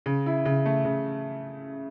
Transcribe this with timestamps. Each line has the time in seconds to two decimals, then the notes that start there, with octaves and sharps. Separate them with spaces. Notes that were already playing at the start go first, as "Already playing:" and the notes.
0.06 C#3
0.26 E4
0.45 C#3
0.66 A3
0.85 C#3